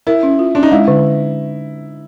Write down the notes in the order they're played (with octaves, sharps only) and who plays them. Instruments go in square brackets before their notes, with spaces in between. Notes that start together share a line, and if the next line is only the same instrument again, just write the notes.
[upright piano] E4 [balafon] A#4
[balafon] C#4
F4
[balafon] C#4 [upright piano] D4
[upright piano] D#4
[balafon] G#3 [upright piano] E4
[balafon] D3